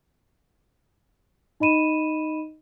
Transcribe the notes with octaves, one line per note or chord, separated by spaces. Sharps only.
D#4 D#5 B5 D#7 E7